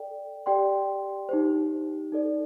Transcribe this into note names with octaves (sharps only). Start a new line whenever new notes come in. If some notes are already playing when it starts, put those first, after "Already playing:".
Already playing: A4 D5 G5
G4 D5 G5 C6
D#4 G4 C5
D#4 A4 D5